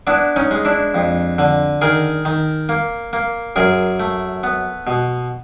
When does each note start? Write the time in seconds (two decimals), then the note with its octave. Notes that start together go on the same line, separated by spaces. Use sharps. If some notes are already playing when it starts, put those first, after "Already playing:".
0.07 B3 D4 E4
0.36 C#4 D#4
0.51 G#3
0.65 D4 E4
0.94 F2
1.39 D3
1.81 D#3 G#4 A#4
2.25 D#3
2.69 A#3
3.13 A#3
3.56 F#2 G#4 A#4
4.00 A3
4.44 B3
4.87 B2